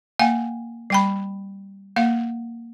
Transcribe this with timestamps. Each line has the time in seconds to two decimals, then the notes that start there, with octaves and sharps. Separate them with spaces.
0.19 A#3 F5 G5 G#5
0.90 G3 G5 B5
1.96 A#3 F5 F#5